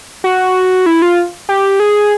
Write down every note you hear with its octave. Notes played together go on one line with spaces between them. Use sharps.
F#4
E4
F4
G4
G#4